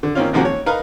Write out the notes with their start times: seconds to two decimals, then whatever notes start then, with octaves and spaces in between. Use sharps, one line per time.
0.03 D3
0.15 D#3 A#3 C4 C#4 F4
0.33 G#2 C3 F3 A#3 C4 F#4
0.45 C#5
0.66 D#4 A#4 B4 F5